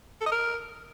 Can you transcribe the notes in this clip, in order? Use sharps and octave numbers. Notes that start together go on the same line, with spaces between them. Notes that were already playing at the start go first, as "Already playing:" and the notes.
A4
D#5
A#4